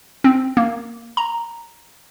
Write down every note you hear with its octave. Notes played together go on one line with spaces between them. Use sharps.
C4
A#3
A#5